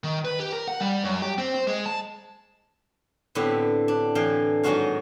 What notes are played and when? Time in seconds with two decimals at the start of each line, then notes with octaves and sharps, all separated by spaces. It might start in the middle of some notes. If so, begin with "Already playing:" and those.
0.04 D#3
0.25 B4
0.39 G4
0.52 A#4
0.68 F#5
0.80 G3
1.04 F#2
1.22 G4
1.38 C4
1.54 C5
1.67 G#3
1.86 A5
3.35 A2 D3 B3 C4 G4
3.88 D4
4.15 A2 D3 E3 F5 G5
4.63 G#2 D#3 F#3 G#3 F#4 F5